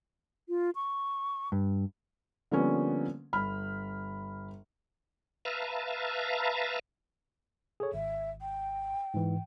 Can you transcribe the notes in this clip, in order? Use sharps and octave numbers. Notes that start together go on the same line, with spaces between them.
F4
C#6
G2
D3 F3 G3 A#3 B3 C#4
G1 B5 F6
B4 E5 F5 A5 A#5
G#4 A4 C#5
G#1 E5
G5
G#2 E3